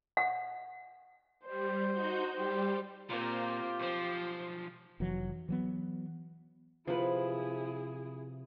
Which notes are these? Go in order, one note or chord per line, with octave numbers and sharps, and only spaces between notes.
F#5
G3 C5
D#4 F#4 G6
G3 G4 C5
A#2 A#3 C4 F4 G4 C5
B1 F3 C5
F1 E3 F#3
E3 F#3 B3
C3 F3 E4 G#4 B4